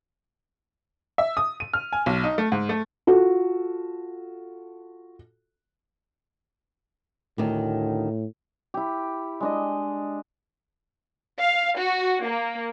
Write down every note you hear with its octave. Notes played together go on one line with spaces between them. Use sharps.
E5
D#6
D#7
F6
G#5
B1
D#4
A3
G#2
A3
F4 F#4 A4
D2 A2 D#3
E4 G4
G#3 D4 D#5
F5
F#4
A#3